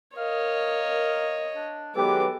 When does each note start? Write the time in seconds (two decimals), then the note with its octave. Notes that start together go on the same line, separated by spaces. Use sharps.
0.17 A#4 C#5 D#5 F5
1.55 D4
1.96 D#3 F#3 G#3 B3 G4 A4 B4 D6